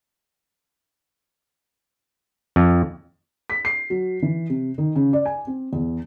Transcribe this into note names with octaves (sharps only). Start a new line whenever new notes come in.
F2
B6
C7
F#3
E3
C3
D#3
C#3
D5
G#5
C4
E2